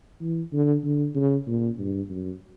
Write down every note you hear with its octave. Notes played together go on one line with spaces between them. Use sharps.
E3
D3
D3
C#3
A#2
G2
F#2